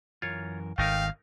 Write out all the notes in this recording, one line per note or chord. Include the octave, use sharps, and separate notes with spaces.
F#2 E3 F4 A#4 C#5
G#1 A3 D#4 A#4 F5 G5